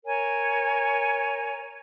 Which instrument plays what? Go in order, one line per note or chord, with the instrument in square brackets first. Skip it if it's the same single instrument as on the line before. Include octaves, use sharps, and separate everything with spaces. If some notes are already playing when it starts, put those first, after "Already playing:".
[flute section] A#4 C#5 G#5